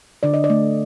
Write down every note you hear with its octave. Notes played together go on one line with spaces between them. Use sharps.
D3 D5
D#5
D5
A3